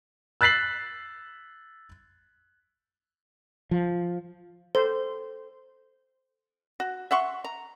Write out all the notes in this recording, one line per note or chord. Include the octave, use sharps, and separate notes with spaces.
E6 F#6 A6 B6 C7 F#7
F3
A4 C5
F#4
E5 F#5 C6 C#6
A#5